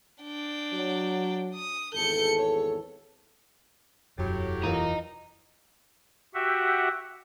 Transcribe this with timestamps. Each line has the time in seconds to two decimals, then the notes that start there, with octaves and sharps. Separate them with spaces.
0.23 D4 G5
0.73 F#3
1.54 D#6
1.94 G#1 E2 A4 G6 C#7
2.39 C#5
4.18 E1 F#2 A2 F#3 G4
4.64 E3 F4 A#4 D#5 A#5
6.34 F#4 G4 E5 F#5